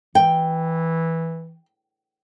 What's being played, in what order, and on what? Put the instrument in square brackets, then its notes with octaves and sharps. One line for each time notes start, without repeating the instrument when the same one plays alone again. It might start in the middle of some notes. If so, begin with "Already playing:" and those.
[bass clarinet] E3 [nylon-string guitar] G5